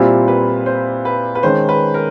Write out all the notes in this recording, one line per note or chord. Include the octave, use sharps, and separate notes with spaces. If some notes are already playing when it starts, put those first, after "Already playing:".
Already playing: A#2 G3 C4 E4 F4 G4
B4
C5
B4
B4
D#3 G#3 C#4 C5
B4
A#4